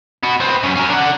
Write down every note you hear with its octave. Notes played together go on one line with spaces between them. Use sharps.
B3 F#4
B3 C4
F#2 C#4
C#4 A#4
D4 F#5